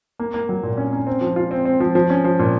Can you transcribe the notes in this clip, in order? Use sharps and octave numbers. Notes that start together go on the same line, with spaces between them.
A#3
A#3
F#3
A#2
C#4
C#4
C4
F3
F4
C4
C4
F3
F3
C#4
F3
A#2